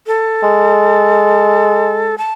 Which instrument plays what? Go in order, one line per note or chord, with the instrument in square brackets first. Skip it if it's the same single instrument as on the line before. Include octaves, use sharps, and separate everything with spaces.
[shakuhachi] A4
[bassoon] G#3
[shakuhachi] A5